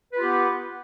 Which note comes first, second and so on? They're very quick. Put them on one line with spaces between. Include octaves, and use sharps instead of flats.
B4 F4 G4 B3